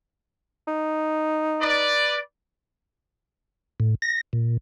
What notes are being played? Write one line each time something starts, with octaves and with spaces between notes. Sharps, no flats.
D#4
B4 D5
A2
A#6
A#2